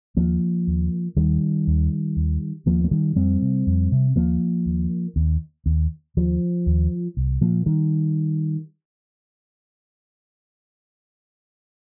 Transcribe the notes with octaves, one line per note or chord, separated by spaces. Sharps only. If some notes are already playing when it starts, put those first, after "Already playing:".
D#2 F3 A#3
D#2
D#2 D#3 G3
D#2
D#2
D#2 F3 A#3
A#3
D#3 G3
F2 G3 C4
C3
F2
C3
D#2 F3 A#3
D#2
D#2
D#2
D#2 F3
D#2
C2
A#2 F3 A#3
D#3 G3